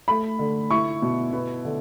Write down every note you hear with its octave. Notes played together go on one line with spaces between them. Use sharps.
A3 B5
D3
E4 C#6
B2
B3
D3